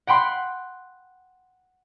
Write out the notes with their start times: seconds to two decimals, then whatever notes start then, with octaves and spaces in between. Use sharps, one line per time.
0.07 F#5 G5 B5 C6